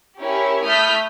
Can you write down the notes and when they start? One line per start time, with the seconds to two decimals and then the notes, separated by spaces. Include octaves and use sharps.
0.21 C#4 E4 G4 A#4 C#5
0.65 A3 E4 D#6 F6 G6 B6